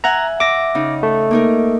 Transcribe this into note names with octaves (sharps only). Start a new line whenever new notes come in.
E5 F#5 G#5 A#5
E5 D6 A#6
C#3 D#4
A3
A#3 D#4 A#4